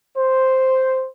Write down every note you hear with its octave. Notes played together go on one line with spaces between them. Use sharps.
C5